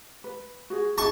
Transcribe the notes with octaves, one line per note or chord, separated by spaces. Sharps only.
B4
F#4 G#4
D#4 G#4 A5 C#6